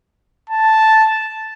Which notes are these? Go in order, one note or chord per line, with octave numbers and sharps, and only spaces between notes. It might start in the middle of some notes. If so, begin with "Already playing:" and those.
A5